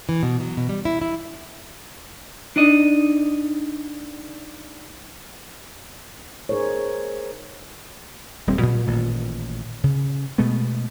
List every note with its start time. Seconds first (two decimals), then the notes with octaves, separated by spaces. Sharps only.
0.09 E3
0.23 B2
0.40 F#3
0.57 B2
0.69 G3
0.85 E4
1.01 E4
2.56 D4 D#4 D5 D#5
6.49 D#4 G#4 A#4 C5 C#5
8.47 D#1 G3 C4
8.61 A#2 F#3
8.86 A1 A#2 D#3 A3
9.84 C#3
10.38 B2 G#3 A3 B3